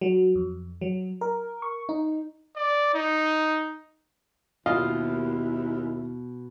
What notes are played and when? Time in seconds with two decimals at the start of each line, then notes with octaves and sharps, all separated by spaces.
0.01 F#3
0.35 F2
0.81 F#3
1.21 A#4
1.62 C#6
1.89 D#4
2.57 D5
2.94 D#4
4.66 D#2 B2 E4 F4 D#5 F5